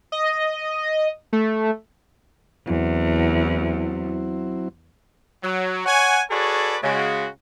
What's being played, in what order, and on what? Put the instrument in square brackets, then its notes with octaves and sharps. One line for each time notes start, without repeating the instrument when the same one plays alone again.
[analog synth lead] D#5
A3
[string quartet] E2 [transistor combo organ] F#3 C4 E4
[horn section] F#3
C#5 F#5 G#5
F#4 G#4 A4 B4 C#5 D5
C#3 G#3 F#4